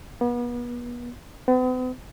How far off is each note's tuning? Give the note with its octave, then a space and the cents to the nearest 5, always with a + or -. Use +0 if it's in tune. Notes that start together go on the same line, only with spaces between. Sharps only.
B3 -35
B3 +45